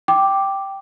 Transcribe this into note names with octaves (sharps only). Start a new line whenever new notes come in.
G5 D6